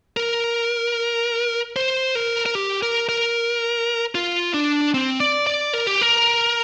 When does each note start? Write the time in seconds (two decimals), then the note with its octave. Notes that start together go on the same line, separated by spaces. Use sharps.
0.17 A#4
1.76 C5
2.15 A#4
2.46 A#4
2.55 G4
2.83 A#4
3.09 A#4
4.15 F4
4.54 D4
4.94 C4
5.20 D5
5.46 D5
5.73 A#4
5.87 G4
6.02 A#4